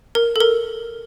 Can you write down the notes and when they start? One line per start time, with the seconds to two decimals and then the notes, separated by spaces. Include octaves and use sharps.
0.15 A#4
0.36 A4
0.40 A#4